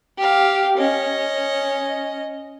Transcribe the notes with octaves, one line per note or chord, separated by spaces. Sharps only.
G4 F5
C#4 D#5